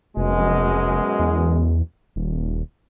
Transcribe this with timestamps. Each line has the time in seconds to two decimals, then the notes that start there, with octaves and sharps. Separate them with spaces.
0.17 F1 F#2 B2 G#3
1.20 E2
2.16 D#1